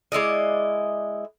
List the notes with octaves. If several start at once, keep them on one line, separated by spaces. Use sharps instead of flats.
G#3 E4 D5 D#5